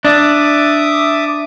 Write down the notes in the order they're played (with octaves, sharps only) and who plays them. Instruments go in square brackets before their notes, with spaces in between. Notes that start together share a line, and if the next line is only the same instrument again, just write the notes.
[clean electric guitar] D4 [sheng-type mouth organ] E5 D6 D#6